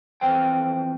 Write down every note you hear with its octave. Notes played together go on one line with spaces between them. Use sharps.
F2 E3 C5 G5